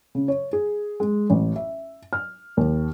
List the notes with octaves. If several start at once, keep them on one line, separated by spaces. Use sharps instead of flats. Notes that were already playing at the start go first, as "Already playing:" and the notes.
C#3
C#5
G#4
G#3
A1
E5
F6
D#2